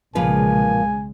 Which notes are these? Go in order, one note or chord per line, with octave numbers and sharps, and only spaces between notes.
B1 A#2 C#3 F3 G#3 B4 G#5